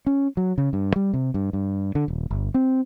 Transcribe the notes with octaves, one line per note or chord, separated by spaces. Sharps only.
C#4
F#3
C#3
G2
G3
C3
G2
G2
D3
D#1
G1
C4